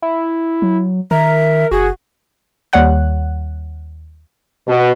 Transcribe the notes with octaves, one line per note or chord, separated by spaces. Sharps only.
E4
F#3
D#3 A#4 E5
F#1 F#4 G#4
D#2 G3 C#5 F#5 F#6
B2